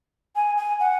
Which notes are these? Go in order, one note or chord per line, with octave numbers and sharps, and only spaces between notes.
G#5
G#5
F#5